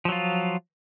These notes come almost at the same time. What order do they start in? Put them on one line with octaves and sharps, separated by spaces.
F3 F#3 F4